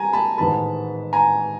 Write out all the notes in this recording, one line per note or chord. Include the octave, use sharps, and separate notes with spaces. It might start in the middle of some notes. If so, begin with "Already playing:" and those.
Already playing: G3 B3 G#5 A#5
A5 B5
A1 G#2 D#3 G#3 B3 A5 B5
G#5 A#5